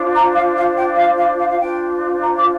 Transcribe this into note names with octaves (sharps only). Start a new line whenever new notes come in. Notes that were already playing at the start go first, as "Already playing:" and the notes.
Already playing: D4 F4 C5
A#5
F5
F5
G5
F5
F5
F5
F5
D4 F4 C5 G5
A#5
D6